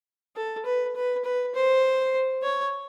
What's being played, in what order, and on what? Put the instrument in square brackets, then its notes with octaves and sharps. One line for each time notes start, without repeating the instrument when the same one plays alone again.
[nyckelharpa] A4
B4
B4
B4
C5
C#5